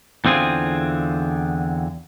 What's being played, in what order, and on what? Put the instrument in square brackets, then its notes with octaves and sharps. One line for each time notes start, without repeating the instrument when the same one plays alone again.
[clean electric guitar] E2 D3 C4 F4 G#4